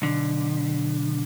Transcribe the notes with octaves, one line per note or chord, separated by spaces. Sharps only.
B1 D3